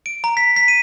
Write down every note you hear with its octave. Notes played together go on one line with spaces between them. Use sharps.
D7
A#5
B6
B6
D#7